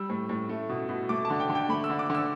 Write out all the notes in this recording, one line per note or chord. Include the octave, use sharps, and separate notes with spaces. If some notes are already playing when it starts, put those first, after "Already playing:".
Already playing: G3 E6
A2
A2
A3
B2
B2
A3 D6
A5
D3
G5
D3
G5
A3 B5
E6
D3
D6
D3
E6